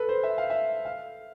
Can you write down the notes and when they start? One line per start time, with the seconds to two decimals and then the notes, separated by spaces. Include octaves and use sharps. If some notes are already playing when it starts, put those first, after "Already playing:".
Already playing: A4 B4
0.09 C5
0.23 E5
0.38 F5
0.50 E5
0.85 F5